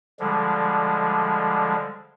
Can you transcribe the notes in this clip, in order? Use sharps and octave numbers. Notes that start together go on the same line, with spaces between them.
D3 F3 G3 G#3